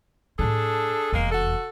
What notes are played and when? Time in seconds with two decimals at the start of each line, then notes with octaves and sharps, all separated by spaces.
0.39 A2 D4 F4 G#4 A4
1.13 F1 E2 G#3 A#3
1.32 F#4 A4